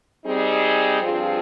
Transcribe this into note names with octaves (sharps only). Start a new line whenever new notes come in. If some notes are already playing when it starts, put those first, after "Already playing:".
G3 C4 D#4 G#4
G2 F3 C4 F4 G#4